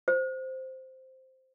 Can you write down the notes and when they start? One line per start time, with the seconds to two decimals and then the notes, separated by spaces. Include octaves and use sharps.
0.08 C5